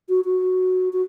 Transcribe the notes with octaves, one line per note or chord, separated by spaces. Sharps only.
F#4
F#4
F#4